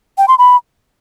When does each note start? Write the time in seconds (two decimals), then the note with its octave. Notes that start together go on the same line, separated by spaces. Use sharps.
0.18 G5
0.28 C6
0.38 B5